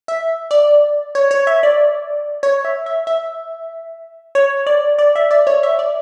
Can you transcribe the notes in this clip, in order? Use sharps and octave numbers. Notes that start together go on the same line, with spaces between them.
E5
D5
C#5
C#5
E5
D5
C#5
E5
E5
E5
C#5
D5
D5
E5
D5
C#5
E5
D5